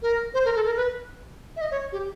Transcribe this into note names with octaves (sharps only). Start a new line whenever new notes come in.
A#4
C5
A#4
A4
A#4
B4
E5
D#5
C#5
G4